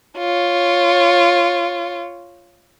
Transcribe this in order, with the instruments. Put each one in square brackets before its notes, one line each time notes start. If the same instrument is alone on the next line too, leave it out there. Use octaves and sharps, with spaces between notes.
[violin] F4 C#5